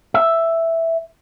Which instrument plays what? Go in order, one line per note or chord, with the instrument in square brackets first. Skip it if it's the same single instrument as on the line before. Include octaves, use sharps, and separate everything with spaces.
[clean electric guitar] E5